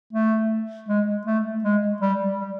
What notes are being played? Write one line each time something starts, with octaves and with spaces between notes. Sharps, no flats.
A3
G#3
A3
G#3
G3
G3